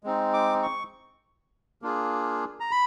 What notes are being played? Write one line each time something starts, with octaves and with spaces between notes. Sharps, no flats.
G#3 C4 D#4
D6
C#6
A#3 D4 F4 G#4
A#5
B5